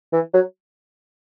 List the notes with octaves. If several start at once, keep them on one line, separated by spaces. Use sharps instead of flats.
E3
F#3